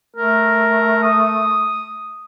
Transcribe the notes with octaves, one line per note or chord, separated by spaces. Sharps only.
A3 A#4
D#6